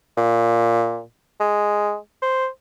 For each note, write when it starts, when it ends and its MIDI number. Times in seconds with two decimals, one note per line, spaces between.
0.18 1.02 46
1.40 1.96 56
2.22 2.48 72